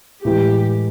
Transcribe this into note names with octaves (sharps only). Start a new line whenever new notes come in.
A2 E3 G#3 G4